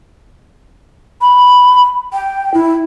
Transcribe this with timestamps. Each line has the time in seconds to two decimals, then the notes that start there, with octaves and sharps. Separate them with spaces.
1.21 B5
2.13 G5
2.54 E4